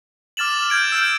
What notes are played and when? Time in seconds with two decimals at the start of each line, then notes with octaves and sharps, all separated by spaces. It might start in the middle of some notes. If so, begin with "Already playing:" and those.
0.37 D6 F6 A6 E7 F#7
0.70 F6 G6 G#6 D7
0.92 E6 G6 D7